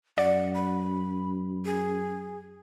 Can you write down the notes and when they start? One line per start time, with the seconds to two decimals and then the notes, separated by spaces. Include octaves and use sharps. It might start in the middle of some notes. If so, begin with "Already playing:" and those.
0.18 F#2 D5 F#5
0.54 B5
1.65 G#4